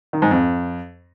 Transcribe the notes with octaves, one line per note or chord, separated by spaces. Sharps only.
D#3
G#2
F2